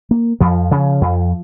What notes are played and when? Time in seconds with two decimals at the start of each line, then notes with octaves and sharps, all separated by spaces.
0.11 A#3
0.40 F2 F3
0.71 C#3
1.01 F2